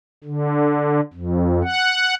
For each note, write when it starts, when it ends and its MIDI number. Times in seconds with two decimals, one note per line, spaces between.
0.24 1.01 50
1.13 1.62 41
1.63 2.15 78